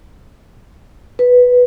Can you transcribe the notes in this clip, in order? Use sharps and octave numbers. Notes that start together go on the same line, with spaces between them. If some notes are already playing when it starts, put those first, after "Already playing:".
B4